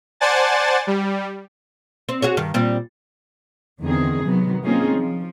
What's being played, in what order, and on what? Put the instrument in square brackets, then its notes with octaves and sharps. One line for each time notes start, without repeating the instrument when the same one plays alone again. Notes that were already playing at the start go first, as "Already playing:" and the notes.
[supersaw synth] C5 D5 F#5 G#5 A5 A6
G3
[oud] C4
F#4 G#4 C#5
G2 D#3
A#2 G3 C4
[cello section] E2 D3 D#3 C4 G#4
C3 D#3 F#3 B3
A#3 C4 C#4 D#4 F4 G#4
F3